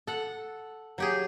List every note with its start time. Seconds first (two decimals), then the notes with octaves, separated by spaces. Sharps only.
0.07 A4 F#5
0.98 F#3 G4 G#4